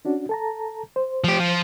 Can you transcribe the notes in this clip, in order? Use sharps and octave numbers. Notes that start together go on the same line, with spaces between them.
C#4 D4 F#4
A4 A5 A#5
C5
F3 G4
F3